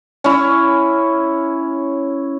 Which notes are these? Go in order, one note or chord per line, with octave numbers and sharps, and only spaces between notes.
C#4 E4